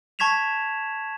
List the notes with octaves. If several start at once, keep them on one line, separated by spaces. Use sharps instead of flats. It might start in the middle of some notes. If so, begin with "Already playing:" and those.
A5 C#6 G#6 B6 E7 F7